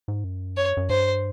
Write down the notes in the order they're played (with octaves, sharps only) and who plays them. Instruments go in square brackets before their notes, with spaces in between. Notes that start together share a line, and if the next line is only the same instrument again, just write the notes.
[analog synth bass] G#2
F#2
[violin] C#5
[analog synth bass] F#2
[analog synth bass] G2 [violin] C5